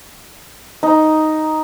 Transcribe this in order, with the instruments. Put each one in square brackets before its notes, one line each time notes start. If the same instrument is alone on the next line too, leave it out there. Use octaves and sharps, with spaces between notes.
[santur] D#4